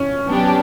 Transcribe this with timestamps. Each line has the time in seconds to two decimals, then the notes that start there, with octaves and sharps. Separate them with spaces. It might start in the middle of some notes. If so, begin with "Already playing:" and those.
Already playing: C#4
0.26 F#3 B3 D4 G4